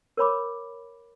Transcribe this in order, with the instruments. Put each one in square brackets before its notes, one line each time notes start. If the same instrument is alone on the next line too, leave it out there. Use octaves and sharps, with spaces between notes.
[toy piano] A#4 C#5 B5 D6